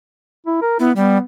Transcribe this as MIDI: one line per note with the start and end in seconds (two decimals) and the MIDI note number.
0.46 0.57 64
0.62 0.79 70
0.80 0.92 59
0.80 0.90 64
0.96 1.18 55
0.96 1.22 59